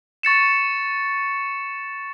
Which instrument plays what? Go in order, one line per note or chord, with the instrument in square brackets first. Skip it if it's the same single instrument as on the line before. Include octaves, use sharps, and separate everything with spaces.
[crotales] C#6 A6 C#7 E7